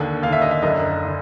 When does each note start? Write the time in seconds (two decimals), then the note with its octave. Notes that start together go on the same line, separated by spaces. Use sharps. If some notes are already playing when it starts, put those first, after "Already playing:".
Already playing: D#2 D3
0.23 D#2 D3 F5
0.33 E5
0.42 D#5
0.51 E5
0.62 F#1 F#2 D3 D#5
1.05 D3